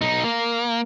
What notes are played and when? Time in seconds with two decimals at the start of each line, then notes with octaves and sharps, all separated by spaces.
0.01 B1 D#4
0.24 A#3